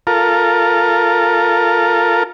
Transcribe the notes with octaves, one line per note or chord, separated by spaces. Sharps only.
F4 A4 A#4